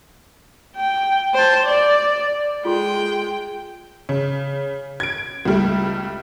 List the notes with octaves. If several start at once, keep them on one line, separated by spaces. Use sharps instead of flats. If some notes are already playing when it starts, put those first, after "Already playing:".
G5
C5 A5
D5
G#3 F4 A4 G5 C6
C#3
G#6 D7
C#2 G3 A3